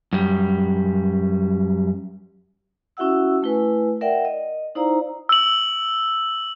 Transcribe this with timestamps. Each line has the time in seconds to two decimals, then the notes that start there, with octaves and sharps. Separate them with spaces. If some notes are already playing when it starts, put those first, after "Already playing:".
0.13 F#2 G3
2.97 C#4 E4 F#4 E5 F#5 E6
3.43 A3 E4 B4 G#5
4.01 A#4 D5 E5 F#5 G5
4.25 D#5
4.75 D#4 E4 C5 D5 F5 A#5
5.29 E6 F#7